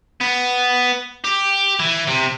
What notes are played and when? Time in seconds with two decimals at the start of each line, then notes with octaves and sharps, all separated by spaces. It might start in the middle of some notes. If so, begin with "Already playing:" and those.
0.21 B3
1.25 G4
1.80 E3
2.07 C3